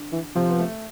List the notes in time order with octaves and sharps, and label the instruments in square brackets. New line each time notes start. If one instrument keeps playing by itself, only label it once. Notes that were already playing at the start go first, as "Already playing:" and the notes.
Already playing: [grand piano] D3 D4
[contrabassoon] E3
[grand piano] C3 C4 [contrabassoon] F3
[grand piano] B3
A3